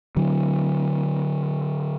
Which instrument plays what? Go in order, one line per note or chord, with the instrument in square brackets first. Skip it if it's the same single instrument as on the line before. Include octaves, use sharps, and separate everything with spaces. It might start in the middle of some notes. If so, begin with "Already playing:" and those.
[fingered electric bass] D3 F#3